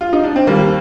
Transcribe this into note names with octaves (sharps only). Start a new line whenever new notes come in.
F4
D#4
D4
C4
D#2 D#3 G3 A#3